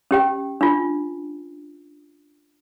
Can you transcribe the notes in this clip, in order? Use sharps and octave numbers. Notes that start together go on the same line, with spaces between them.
C#4 G4 G5
D4 F4